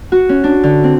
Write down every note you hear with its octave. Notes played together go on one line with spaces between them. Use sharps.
F#4
C#4
D4
D3
C4